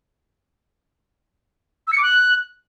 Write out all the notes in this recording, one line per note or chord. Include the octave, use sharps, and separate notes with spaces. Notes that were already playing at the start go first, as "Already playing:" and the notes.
E6
C#7
D6
F#6